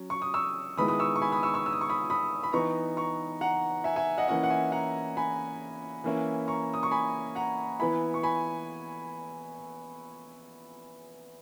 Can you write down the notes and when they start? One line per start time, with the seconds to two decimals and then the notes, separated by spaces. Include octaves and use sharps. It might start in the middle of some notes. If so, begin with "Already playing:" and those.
Already playing: F#3 C#4
0.10 C#6
0.22 D#6
0.34 C#6 E6
0.77 D#3 G#3 B3 E4 B5 D#6
0.88 B5 D#6
0.99 C#6 E6
1.16 C#6
1.22 G#5 B5
1.32 B5 D#6
1.43 C#6 E6
1.54 C#6 E6
1.66 E6
1.73 D#6
1.81 C#6
1.89 B5 D#6
2.10 B5 D#6
2.43 B5
2.53 E3 B3 D#4 A#5 C#6
2.97 A#5 C#6
3.41 F#5 A#5
3.84 E5 G#5
3.96 E5 G#5
4.18 D#5 F#5
4.28 E3 A#3 C#4 E4 D#5 F#5
4.43 F#5
4.50 E5 G#5
4.72 F#5 A#5
5.17 G#5 B5
6.04 E3 A#3 C#4 E4
6.48 A#5 C#6
6.74 D#6
6.83 C#6
6.91 G#5 B5
7.35 F#5 A#5
7.80 E3 B3 E4 G#5 B5
8.14 C#6
8.23 G#5 B5